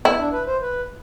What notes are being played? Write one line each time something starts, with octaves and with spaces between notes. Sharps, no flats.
B3 E4
D4
B4
C5
B4